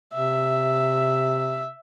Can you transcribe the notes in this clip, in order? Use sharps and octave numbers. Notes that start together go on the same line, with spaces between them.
C3 E5